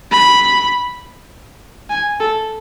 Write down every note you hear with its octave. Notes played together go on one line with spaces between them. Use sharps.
B5
G#5
A4